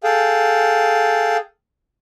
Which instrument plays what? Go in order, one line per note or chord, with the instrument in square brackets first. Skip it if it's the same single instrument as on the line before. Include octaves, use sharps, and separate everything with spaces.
[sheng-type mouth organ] G#4 A4 F5 G5